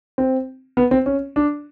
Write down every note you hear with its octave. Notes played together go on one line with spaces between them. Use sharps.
C4
B3
C4
C#4
D4